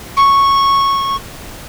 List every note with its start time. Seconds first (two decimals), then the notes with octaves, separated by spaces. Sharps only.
0.16 C#6